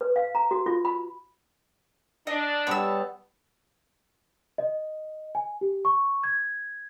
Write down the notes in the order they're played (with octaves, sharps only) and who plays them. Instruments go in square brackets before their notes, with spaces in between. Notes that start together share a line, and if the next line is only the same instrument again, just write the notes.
[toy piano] B4
F5
A#5
F#4
F4
B5
[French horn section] D4 [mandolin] D#5
[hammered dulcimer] G3 B3 A5 [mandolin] C#5 E6
[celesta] D#5
G#5
G4
C#6
G#6